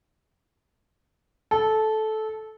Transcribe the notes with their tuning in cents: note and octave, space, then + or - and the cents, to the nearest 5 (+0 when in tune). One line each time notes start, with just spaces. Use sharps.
A4 -15